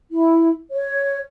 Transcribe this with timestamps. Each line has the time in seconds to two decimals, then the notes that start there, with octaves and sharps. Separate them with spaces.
0.12 E4
0.72 C#5